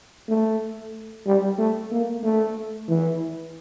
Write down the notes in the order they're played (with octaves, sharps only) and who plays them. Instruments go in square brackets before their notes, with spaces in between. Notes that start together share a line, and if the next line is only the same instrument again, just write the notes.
[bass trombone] A3
G3
A3
A#3
A3
E3